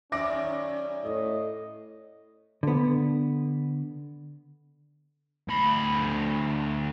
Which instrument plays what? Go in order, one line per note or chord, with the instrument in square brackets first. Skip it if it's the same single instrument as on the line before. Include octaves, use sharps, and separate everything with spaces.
[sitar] F#2 D#3 D5 [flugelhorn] C#4 [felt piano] E5 D6 A#6
[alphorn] A2 [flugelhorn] D#5
[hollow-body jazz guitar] D3 B3
[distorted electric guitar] D2 B5